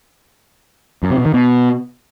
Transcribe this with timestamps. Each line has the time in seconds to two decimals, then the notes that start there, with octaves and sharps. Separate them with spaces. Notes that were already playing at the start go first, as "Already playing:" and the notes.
1.03 F#2
1.10 C3
1.18 B2
1.26 D#3
1.34 B2